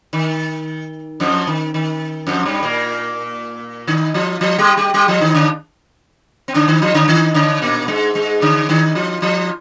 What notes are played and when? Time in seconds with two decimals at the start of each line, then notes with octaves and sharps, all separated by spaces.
0.13 D#3
1.20 F2 F3
1.47 D#3
1.74 D#3
2.27 F2 F3
2.45 G2 G3
2.63 A#2 A#3
3.87 D#3 D#4
4.14 F3 F4
4.41 F3 F4
4.59 G3 G4
4.77 G3 G4
4.94 G3 G4
5.08 F3 F4
5.21 D#3 D#4
5.35 D3 D4
6.48 C4
6.54 D3 D4
6.68 D#3 D#4
6.82 F3 F4
6.94 D3 D4
7.08 D#3 D#4
7.34 D3 D4
7.62 A#2 A#3
7.88 G#2 G#3
8.15 G#2 G#3
8.41 D3 D4
8.69 D#3 D#4
8.95 F3 F4
9.22 F3 F4